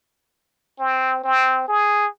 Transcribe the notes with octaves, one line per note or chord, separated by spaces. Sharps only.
C4
C4
G#4